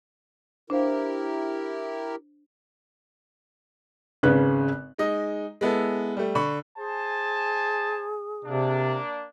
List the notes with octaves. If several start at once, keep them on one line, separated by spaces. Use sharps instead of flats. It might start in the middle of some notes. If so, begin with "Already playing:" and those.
D4 E4 G4 A#4 C5 F5
G#1 C#3 B4 F#6
G#3 D#4 D#5
G#3 B3 E4 A4
G3 A3
D3 B5 C#6
G#4 C5 G#5 A5
C3 A#3 D4